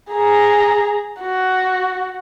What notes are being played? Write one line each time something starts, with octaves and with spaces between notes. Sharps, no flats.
G#4 A#5
F#4